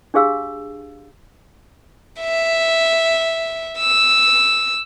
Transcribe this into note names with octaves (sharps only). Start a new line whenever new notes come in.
D4 G4 G#4 F5 E6
E5
E6